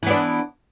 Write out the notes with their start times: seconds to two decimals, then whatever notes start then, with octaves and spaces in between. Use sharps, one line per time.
0.03 E3
0.07 B3
0.10 D4